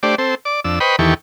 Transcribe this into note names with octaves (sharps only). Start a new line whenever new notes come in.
A3 D4 G4 C5 D5
C4 A4 C5
D5 D6
F2 D4 E6
B4 C5 D#5 G5 B5 C#6
E2 D#3 E3 G4 A4 C#6